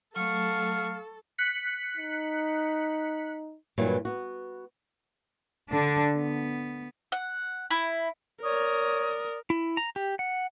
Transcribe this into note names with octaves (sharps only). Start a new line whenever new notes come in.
F#3 A3 A4 F5 C#6
F#6 B6 C#7
D#4
G2 A#2 E3 F#3
B3 F#4
D3 D4
B3
F#5
E4
A#4 C#5 D5 D#6
E4
A#5
G4
F#5